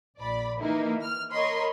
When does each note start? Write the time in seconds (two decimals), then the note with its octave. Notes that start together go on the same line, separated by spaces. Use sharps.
0.19 A#1 D5 B5
0.60 D#3 E3 A#3 D#4 E4
1.02 F6
1.31 A#4 C#5 D#5 B5 C6